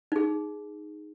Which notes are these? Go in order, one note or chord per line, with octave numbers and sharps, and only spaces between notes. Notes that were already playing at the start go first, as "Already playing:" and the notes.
D#4 G#4